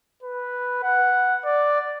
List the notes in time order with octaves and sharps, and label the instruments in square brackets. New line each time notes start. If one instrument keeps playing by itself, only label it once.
[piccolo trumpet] B4
F#5
D5